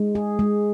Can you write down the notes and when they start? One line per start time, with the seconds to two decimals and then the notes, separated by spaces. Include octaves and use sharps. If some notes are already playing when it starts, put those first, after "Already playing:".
Already playing: G#3
0.15 G#4
0.39 G#3